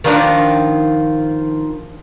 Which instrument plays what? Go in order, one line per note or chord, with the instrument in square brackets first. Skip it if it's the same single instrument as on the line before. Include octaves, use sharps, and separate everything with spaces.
[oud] D#3 F3 D4